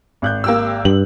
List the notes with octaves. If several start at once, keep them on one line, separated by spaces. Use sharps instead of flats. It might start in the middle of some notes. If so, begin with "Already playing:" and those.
G#1 F#6 G6
A#3 G4 E6
G2 F#7